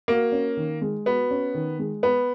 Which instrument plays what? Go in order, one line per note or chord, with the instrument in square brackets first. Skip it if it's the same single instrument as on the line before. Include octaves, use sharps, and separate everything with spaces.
[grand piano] A#3 [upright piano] F#4
[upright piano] C#4
D#3
G#3
[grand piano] B3 [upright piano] F#4
[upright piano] C#4
D#3
G#3
[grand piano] B3 [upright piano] B4